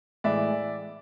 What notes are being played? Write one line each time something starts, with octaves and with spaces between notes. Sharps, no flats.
A2 E3 G#3 D5 E5